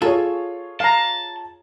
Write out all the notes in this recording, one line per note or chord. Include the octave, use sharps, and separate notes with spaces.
F4 G#4 A4 C#5 G#5
F5 A5 A#5